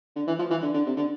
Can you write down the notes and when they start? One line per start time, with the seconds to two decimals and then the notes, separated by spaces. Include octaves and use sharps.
0.16 D3
0.27 E3
0.39 F3
0.51 E3
0.62 D3
0.74 D3
0.86 C3
0.97 D3